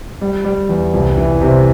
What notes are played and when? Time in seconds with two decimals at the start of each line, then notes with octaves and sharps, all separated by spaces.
0.21 G3
0.45 G3
0.69 E2
0.94 C2
1.18 E3
1.41 C3